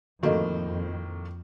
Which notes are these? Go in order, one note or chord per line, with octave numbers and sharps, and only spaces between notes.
F2 A2 D#3 A#3 F#4 A4 D#5